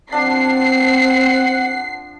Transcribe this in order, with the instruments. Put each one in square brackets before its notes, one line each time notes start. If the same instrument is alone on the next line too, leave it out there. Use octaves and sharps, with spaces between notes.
[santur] F3 D4 [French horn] C4 [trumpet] F#5 [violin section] C7